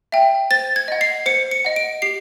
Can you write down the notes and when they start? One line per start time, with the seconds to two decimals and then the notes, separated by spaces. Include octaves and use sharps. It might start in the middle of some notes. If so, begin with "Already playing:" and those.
0.12 E5 G5
0.51 C5 A6
0.76 G#6
0.88 D#5 F#5
1.01 C7
1.26 C5 C#7
1.51 C#7
1.65 D#5 F#5
1.76 D7
2.02 G4 C7